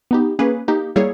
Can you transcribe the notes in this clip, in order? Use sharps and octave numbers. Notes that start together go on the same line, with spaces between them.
B3 D#4 G4
A#3 C#4 G#4 B4
A#3 D#4 G4
G3 A#3 E4 G#4 C#5